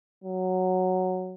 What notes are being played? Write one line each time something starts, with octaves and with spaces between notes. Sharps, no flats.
F#3